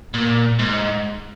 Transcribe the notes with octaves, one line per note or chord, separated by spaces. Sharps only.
A#2
G#2